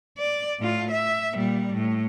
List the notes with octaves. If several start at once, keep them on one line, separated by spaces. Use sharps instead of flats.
D5
A2 F4
E5
A#2 G3
A2